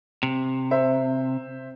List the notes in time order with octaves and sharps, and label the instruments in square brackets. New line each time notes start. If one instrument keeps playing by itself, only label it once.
[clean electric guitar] C3
[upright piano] C5 E5